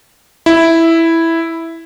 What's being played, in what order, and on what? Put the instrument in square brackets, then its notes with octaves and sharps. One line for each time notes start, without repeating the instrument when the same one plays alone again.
[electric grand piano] E4